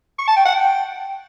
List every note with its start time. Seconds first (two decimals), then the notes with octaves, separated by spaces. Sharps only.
0.19 C#6
0.27 A5
0.36 G5
0.45 F#5
0.54 G5